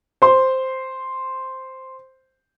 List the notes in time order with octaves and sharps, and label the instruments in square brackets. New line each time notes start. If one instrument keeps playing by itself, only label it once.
[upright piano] C5 C6